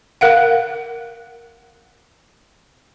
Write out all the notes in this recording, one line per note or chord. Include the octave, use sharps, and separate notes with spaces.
A#4 F5 F#5